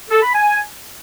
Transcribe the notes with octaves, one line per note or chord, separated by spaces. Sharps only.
A4
B5
G#5